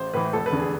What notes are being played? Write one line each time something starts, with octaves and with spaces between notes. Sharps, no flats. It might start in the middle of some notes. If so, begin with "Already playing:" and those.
Already playing: A1 C5
A2 E3 B4
F1 A4
B4
E2 D3
G#4